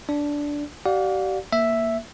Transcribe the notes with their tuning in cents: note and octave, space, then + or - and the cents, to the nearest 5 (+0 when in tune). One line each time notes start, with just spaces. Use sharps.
D4 -10 D5 -10
G4 -40 D5 +0 F5 +35
A#3 +0 E5 +0